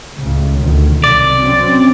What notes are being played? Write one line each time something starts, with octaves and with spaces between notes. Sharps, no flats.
C#2 A2 C#3
D2 B2 D#3
C2 D5
F#3 C4 C#4